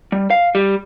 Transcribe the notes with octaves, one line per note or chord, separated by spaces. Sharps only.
G3
F5
G3